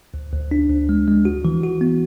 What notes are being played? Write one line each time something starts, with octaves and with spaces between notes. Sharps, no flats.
D2
D2
D4
D2
G#3
G#3
F#4
E3
F#4
B3